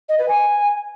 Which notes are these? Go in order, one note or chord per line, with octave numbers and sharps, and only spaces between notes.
D#5
B4
G#5